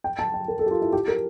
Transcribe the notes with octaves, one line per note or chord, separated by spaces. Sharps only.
G5
A5
G5
A#4
A4
G4
F4
E4
G4
A#4